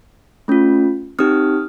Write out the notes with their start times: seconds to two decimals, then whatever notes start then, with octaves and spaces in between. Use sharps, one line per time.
0.48 A3 C#4 F4
1.19 C4 D#4 G4 D#6 F6